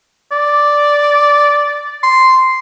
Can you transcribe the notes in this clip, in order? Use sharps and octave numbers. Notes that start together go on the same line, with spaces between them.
D5
C6